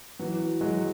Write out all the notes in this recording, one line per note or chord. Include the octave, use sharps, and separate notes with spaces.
E3 F#3
F#3 G#3